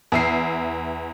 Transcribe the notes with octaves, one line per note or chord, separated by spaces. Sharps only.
E2 E5 C7